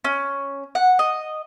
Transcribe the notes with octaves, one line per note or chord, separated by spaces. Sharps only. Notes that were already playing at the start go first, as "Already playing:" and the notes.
C#4
F#5
D#5